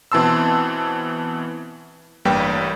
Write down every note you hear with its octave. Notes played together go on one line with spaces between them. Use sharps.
B2 E3 C4 A5 C6 E6
A1 G2 G3 A#3 B4 G5